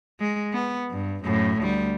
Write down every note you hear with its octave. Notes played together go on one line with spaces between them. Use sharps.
G#3
B3
G2
F#2 A2
D2 G3